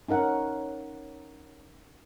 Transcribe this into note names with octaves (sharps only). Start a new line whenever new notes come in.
C#4 D#4 A#4 F#5